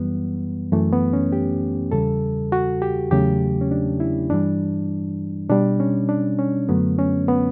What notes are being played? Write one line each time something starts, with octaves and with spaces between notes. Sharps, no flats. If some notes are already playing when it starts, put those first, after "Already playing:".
Already playing: F#2 E3 G3 B3
F#2 E3 A3
B3
C#4
G4
E2 C#3 G3 A4
F#4
G4
E2 C#3 F#3 A3 G4
C#4
D4
E4
G2 E3 G3 D4
B2 G3 D4
C#4
D4
C#4
F#2 D3 F#3 A3 B3
C#4
B3